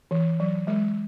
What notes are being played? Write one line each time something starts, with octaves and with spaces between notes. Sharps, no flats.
E3
F#3
G#3